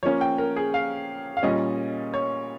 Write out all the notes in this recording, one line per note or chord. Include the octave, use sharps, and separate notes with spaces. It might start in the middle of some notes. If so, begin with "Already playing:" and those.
F3 A#3 C#4 C#5
G5
A#4
G#4
F5
F5
A#2 G3 C#4 D#5
C#5